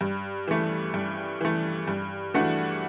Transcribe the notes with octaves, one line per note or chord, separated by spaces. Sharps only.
G2
E3 A3
G2
E3 A3
G2
E3 A3 D4 F#4